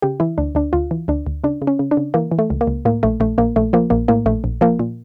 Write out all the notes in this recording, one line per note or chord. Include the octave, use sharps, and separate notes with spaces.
C#3 G4
E3 E4
D2 D4
D2 D4
D2 F4
E3
D2 D4
D2
C#3 D4
C#3
C#4
C#3
D4
C#3
E3 A#3
E3
A3
C#2
A#3
C#2
A2 A#3
A#1 A3
A#1 A3
A#1 A#3
A#1 A3
F3 A#3
A#1 A#3
A2 A#3
A#1 A3
A#1
F3 A#3
A#2